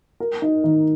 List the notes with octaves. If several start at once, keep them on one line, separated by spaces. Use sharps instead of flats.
A#4
D#4
D#3